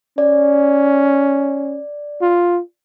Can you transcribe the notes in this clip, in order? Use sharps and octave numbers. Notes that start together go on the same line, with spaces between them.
C#4 D5
F4